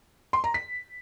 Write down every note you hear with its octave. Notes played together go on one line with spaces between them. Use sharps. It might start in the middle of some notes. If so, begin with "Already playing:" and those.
C6
A#5
B6